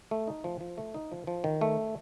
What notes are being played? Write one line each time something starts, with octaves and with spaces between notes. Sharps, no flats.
A3
D#4
F3
F3
A3
D#4
F3
F3
D#3
A3